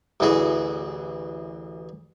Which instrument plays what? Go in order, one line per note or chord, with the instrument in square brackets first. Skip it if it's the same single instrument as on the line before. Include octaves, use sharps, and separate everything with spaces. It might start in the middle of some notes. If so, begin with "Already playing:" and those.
[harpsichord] A1 D2 E3 F#4 G#4